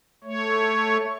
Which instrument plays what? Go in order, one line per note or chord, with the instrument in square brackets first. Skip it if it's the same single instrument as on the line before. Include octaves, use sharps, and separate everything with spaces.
[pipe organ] A3 C#5